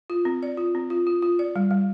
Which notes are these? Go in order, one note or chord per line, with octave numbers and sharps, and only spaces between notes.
F4
C4
D5
F4
C4
F4
F4
F4
D5
G3
G3